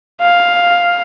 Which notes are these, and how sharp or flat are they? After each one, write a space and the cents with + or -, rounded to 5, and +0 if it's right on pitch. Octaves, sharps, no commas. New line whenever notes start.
F5 +5